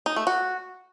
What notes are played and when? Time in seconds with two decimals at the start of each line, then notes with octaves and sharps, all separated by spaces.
0.06 D#4
0.16 A3
0.27 F#4